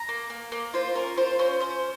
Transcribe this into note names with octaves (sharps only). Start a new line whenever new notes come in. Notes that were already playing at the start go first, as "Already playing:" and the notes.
Already playing: A#5
A#3
A#3
A#3
F4 C5
C#4 A#4
F4 C5
C#4 C5
C#4 C5